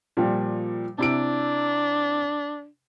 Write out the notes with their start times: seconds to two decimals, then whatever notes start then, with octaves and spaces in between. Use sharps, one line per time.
0.17 A#2 F3 G3
0.99 C3 D4 E4 D7